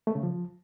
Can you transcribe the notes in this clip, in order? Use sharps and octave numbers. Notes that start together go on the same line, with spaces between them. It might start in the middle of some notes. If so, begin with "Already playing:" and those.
A3
C#3
F3